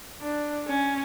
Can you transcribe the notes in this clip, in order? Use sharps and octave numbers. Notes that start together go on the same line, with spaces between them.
D4
C#4